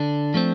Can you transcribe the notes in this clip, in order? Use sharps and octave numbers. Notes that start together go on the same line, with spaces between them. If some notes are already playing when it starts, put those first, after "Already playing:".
Already playing: D3 D4
F3 A3 C4